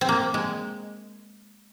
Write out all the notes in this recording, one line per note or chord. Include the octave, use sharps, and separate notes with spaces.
C4
A#3
G#3